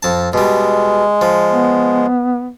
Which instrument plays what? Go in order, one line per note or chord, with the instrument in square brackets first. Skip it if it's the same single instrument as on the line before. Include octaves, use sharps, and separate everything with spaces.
[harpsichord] F2 A5
[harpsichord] B2 G3 [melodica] G#3
[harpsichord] F3
[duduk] B3